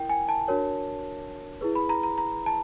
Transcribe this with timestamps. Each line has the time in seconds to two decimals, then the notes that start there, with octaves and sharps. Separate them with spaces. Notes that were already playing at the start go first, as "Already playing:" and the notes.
Already playing: E4 A#4 G5
0.09 G#5
0.29 A5
0.48 D4 F#4 A#4 C#5
1.61 E4 G#4 B4
1.75 B5
1.89 A#5
2.03 A#5
2.18 A#5
2.46 A5